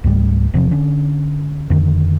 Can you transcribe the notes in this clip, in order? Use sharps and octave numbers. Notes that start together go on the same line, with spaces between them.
C#2 G#2 G3 A3
E1 C3 F3 C4
D3 C#4 D4
F2 D3 D#3